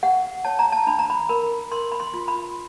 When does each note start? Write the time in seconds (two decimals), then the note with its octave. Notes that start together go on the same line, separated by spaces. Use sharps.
0.03 G4 F#5
0.45 C#5 A5
0.59 A#5
0.72 A5
0.87 D4 B5
0.99 A#5
1.10 B5
1.29 A#4 B5
1.71 A#4 C6
1.92 B5
2.00 C6
2.14 F4
2.28 B5